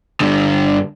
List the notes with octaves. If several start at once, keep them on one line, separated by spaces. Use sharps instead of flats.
G2 D3